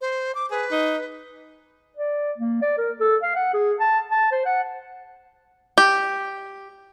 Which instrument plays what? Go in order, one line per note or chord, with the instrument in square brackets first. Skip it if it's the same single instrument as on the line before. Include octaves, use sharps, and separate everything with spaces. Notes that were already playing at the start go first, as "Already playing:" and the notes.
[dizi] C5
D6
[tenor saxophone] G#4 [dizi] B4
[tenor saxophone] D#4
[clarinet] D5
A#3
D5
A#4
A4
F5
F#5
G#4
A5
A5
C5
F#5
[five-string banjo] G4